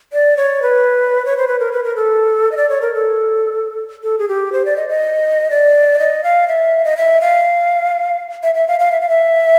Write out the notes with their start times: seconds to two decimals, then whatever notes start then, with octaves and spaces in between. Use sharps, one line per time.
0.13 D5
0.37 C#5
0.62 B4
1.25 C#5
1.37 C5
1.48 B4
1.60 A#4
1.72 B4
1.84 A#4
1.96 A4
2.52 D#5
2.57 D5
2.69 C#5
2.82 A#4
2.94 A4
4.03 A4
4.19 G#4
4.28 G4
4.53 C5
4.65 D5
4.77 D#5
4.89 D#5
5.51 D5
5.99 D#5
6.24 F5
6.48 E5
6.85 D#5
6.97 E5
7.21 F5
8.43 E5
8.55 E5
8.68 F5
8.80 F5
8.92 E5
9.01 F5
9.09 E5